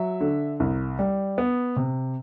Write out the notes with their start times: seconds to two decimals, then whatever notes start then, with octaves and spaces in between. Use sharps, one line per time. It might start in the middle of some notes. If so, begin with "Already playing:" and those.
Already playing: F#3 E5
0.20 D3
0.60 C2
0.99 G3
1.38 B3
1.76 C3